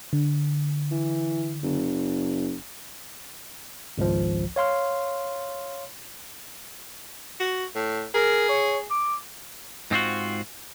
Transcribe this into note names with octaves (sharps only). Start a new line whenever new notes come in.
D3
E3
F#1
G#1 C#2 F3
C#5 F5 C6 F6
F#4
A2
G#4 A#4
C#5
D6
G#2 C4 F4 F#4